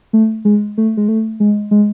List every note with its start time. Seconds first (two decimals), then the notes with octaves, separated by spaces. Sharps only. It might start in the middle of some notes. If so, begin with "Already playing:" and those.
0.13 A3
0.45 G#3
0.78 A3
0.97 G#3
1.08 A3
1.40 G#3
1.71 G#3